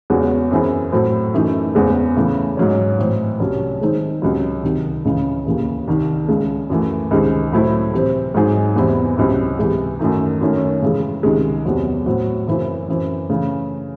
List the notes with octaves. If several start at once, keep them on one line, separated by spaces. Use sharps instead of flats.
E2 C#3 G#3 C#4 F#4
F#2 E3 C4 E4 G#4
A2 F#3 C4 F#4 A4
F#2 E3 A3 D#4
E2 C#3 G#3 C4
C#3 E3 A3
G#2 F#3 C#4
A2 E3 C4
C2 C3 F#3 C#4
D#3 G#3 C4 D#4
C#2 C3 F#3
C2 C3 D#3
C#2 C#3 E3
D#2 C#3 E3
C2 C3 D#3
C#2 C#3 G#3
F#2 E3 A3
C#2 C3 D#3 G#3 C4
A2 F#3 A3 C4 E4
C3 E3 C4
G#2 F#3 C4 D#4 G#4
E2 C3 E3 C4 E4
C#2 C3 F#3 C4 E4
C3 E3 G#3
F#2 D#3 A3 D#4
F#2 D#3 A3 C#4
C#3 E3 G#3
C#2 C3 D#3 G#3
E2 C3 F#3 C4
A2 F#3 C4 F#4
F#2 C#3 E3 C4 E4
F#2 E3 C4
C#3 E3 A3